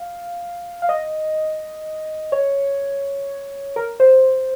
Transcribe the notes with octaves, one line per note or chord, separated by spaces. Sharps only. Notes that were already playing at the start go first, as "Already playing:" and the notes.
Already playing: F5
F5
D#5
C#5
A#4
C5